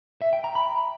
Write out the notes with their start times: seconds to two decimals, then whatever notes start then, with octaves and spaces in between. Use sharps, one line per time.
0.22 E5
0.33 G5
0.44 A#5
0.55 B5